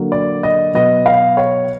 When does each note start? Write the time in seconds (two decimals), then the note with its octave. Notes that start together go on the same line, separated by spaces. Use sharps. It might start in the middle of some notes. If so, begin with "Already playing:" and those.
Already playing: D3 F#3 A#3
0.12 D5
0.43 D#5
0.74 B2 F#3 B3 D#5
1.06 F5
1.37 C#5